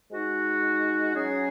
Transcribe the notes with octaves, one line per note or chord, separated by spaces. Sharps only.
G#3 D#4 F#4
F#3 C#4 G#4